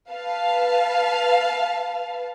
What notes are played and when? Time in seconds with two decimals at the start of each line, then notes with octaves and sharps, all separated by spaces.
0.11 B4 F5 A5